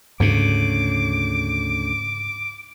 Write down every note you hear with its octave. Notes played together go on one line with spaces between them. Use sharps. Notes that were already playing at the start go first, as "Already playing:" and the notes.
D2 G#2 C#3 D6